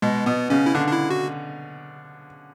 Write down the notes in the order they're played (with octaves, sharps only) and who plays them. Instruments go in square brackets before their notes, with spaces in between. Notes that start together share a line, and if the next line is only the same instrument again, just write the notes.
[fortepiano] B2 [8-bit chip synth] G#3
[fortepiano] B2 [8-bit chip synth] B3
[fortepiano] C#3 [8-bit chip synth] C#4
[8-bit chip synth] E4
[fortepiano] D3 [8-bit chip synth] D4
[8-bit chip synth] D4
E4
F#4